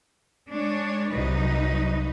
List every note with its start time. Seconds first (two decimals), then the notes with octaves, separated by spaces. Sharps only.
0.51 G#3 D4 C#5
1.12 C2 F#3 D#4 B4